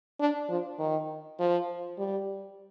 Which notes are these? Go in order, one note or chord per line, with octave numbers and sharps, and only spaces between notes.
D4
F3
D#3
F3
G3